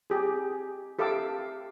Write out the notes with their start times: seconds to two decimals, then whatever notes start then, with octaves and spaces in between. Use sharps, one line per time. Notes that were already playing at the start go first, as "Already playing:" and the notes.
0.10 G4 G#4
0.99 G4 A4 E5 F5 D6 E6